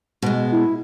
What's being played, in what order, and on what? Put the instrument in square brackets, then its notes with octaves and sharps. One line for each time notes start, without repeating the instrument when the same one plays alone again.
[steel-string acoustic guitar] B2 G#3
[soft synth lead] E4